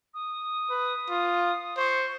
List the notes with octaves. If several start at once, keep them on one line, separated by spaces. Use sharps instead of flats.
D#6
B4
F4
C5 C#6